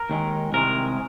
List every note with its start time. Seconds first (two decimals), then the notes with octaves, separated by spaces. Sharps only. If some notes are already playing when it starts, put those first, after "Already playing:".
Already playing: A#4
0.10 D#2 D#3 G#3
0.53 C2 C3 D#3 G#3 A#4